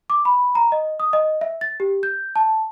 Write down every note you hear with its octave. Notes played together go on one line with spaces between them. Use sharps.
D6
B5
A#5
D#5
D#6
D#5
E5
A6
G4
G6
A5